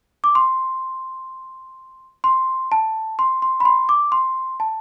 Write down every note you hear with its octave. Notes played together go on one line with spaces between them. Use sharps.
D6
C6
C6
A5
C6
C6
B5
C6
D6
C6
A5